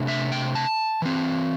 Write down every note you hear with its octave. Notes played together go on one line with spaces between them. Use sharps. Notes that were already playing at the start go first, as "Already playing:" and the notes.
Already playing: C3 A3 D4
E5
G5
A5
E3 C4